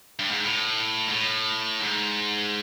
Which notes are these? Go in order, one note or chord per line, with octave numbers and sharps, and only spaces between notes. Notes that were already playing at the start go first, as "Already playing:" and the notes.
G2
G#2
A2
G#2
A2
G#2